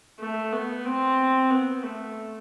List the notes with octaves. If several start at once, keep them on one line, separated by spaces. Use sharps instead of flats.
A3
B3
C4
B3
A3